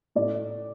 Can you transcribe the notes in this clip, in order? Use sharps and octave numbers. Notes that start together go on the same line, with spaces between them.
A2 D5